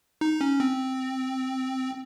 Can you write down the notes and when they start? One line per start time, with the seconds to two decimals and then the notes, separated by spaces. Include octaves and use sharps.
0.21 D#4
0.41 C#4
0.60 C4